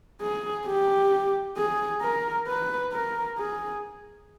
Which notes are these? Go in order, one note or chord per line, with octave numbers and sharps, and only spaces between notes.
G#4
G4
G#4
A#4
B4
A#4
G#4